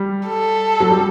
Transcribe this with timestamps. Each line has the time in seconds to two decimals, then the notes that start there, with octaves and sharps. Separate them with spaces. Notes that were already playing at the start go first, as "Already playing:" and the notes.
Already playing: G3
0.28 A4
0.80 F#3
0.90 G3